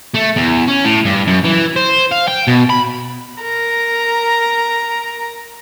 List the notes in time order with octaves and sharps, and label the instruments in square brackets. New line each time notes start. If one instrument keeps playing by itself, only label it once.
[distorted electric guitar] A3
E2
C#4
A2
G2
F#2
E3
C5
F5
G5
B2
B5
[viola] A#4 A#5